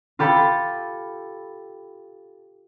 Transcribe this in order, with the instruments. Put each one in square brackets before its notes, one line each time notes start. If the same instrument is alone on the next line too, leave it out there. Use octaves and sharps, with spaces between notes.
[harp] F4 G4 A4 B5